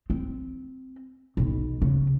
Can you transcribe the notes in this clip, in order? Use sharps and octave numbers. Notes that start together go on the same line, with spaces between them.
C4
B1 D#3
C#3